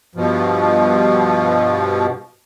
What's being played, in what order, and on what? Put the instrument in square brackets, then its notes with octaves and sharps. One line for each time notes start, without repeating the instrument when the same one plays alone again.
[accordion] G2 B2 F3